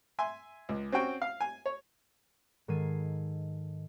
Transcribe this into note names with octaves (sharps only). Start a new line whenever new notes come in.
E5 G#5 C6
C#2
C4 C#4 F#4 G5
F5
G#5
C#5
G#2 D#3 A4 G#6 C7 D#7